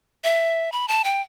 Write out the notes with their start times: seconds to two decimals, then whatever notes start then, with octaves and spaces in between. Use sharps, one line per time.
0.24 E5
0.72 B5
0.88 A5
1.04 G5